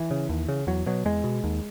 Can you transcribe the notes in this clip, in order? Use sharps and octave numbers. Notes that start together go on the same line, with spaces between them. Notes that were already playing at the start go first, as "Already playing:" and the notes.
Already playing: E3
C#3
D#2
C#3
E2 F#3
B2 F#3
E2 G#3
B2
D#2